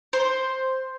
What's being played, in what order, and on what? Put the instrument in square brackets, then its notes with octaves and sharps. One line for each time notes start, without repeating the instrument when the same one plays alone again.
[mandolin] C5